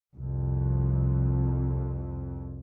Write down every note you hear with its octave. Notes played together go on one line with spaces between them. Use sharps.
C2 F2